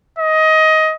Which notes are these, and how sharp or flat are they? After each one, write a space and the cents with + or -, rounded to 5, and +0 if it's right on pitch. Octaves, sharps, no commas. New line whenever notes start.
D#5 +20